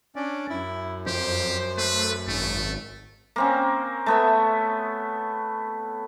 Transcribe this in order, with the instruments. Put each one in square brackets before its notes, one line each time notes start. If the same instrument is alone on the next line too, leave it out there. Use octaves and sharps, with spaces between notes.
[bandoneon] C#4 D4 D5
[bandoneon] F#2 [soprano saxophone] E4
[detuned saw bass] F2 [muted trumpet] G4 [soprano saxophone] C5
[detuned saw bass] A3 [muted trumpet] B4
[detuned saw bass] G#1 [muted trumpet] A3 [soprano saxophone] C#4
[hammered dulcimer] A#3 C4 C#4
A3 B3 E5